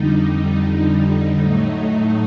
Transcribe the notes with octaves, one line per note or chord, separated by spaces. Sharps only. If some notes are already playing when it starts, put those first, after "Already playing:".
Already playing: F2 D3 G3 D#4
A2 F#3 A3